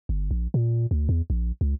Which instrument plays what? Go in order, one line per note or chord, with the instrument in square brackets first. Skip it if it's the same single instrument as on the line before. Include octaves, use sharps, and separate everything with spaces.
[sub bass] G1
A#1
A#2
D2
E2
A#1
C#2